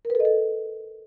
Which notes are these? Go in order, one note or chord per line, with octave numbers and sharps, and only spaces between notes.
A#4
B4
A4
D#5
A4